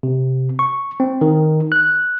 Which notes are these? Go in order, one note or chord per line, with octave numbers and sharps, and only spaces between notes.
C3
C#6
C4
D#3
F#6